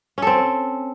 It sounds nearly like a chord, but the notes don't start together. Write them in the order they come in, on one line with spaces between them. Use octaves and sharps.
C#4 A4 C4